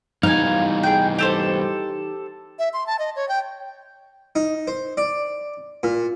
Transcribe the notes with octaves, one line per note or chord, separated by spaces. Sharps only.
E3 G3 B3 D#4 F5 G#5
G#4 G5
G4 A4 C5
E5
C6
A5
D#5
C#5
G5
D#4
C5
D5
A#2